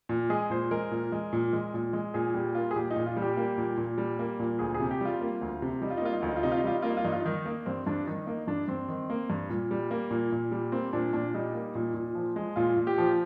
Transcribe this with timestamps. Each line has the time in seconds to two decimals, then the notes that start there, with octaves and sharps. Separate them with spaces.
0.09 A#2
0.30 G#3 G#4
0.50 A#2 C5
0.71 G#3 A#4
0.91 A#2
1.12 G#3
1.33 A#2
1.53 G#3
1.74 A#2
1.93 G#3
2.14 A#2 G#4
2.34 G3 G4
2.55 A#3 F4
2.71 G#4
2.76 A#2 G4
2.91 D#4
2.96 A#2
3.06 F4
3.17 G3
3.22 G4
3.37 A#3
3.58 A#2
3.77 A#2
3.98 G3
4.19 A#3
4.40 A#2
4.59 D2 G#4
4.74 G#4
4.80 C3
4.91 G4
5.01 G3 F4
5.21 A#3
5.41 D2
5.62 C3
5.82 G3 D#4
5.90 F4
5.97 D#4
6.02 A#3 F4
6.13 D#4
6.21 D2 F4
6.29 D#4
6.36 F4
6.43 C3 D#4
6.52 F4
6.58 D#4
6.64 G3 F4
6.75 D#4
6.82 A#3 F4
6.90 D#4
6.97 F4
7.04 G2 D#4
7.12 F4
7.20 D#4
7.26 D#3
7.45 A#3
7.66 G2 C4
7.87 G2 D4
8.07 D#3 D#4
8.27 A#3 D#4
8.47 G2 D4
8.68 G2 C4
8.88 D#3
9.10 A#3
9.30 G2
9.49 A#2
9.71 G3
9.91 A#3
10.11 A#2
10.32 A#2
10.52 G3
10.72 A#3 C4
10.93 A#2 D4
11.13 A#2 D4
11.34 G3 D#4
11.54 A#3
11.75 A#2
11.95 A#2
12.15 F3
12.36 G#3
12.56 A#2 F4
12.77 A#2
12.87 G4
12.98 F3